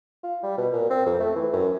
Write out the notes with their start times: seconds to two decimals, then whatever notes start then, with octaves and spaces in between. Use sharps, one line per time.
0.23 F4
0.43 G3
0.57 B2
0.73 A#2
0.90 C4
1.06 F2
1.20 A3
1.36 E3
1.53 F#2